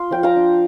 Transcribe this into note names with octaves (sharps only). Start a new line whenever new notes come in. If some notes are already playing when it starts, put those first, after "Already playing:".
Already playing: F4 C6
F3 G5
F5 A#5
D4